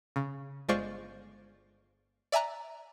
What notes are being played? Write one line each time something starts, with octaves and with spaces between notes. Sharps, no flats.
C#3
G1 G#3 F4 C5 D5 C#6
D5 E5 G#5 A#5 F#6